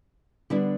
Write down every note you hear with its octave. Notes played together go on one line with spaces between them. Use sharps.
D3 G3 B3 D4 E4